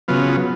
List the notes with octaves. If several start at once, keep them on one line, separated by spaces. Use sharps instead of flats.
C#3 F#3 B3 F4